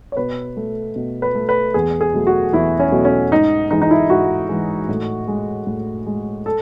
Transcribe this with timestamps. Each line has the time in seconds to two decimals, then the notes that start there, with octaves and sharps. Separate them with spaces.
0.12 C#5
0.17 B2 B4
0.57 A3
0.96 B2
1.22 B4
1.35 A3
1.49 B4
1.74 E2 G#4
2.01 G#4
2.14 B2 F#3 A3
2.27 F#4
2.53 E2 E4
2.80 C#4
2.92 B2 F#3 A3
3.05 C#4
3.32 G#2 D#4
3.71 E3 G#3 D#4
3.82 D#4
3.91 E4
4.10 G#2 F#4
4.49 E3 G#3
4.89 A2
5.28 G#3
5.67 A2
6.06 G#3
6.46 A4